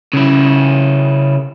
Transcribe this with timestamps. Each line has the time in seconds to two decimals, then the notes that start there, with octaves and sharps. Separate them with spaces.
0.13 C#3 E4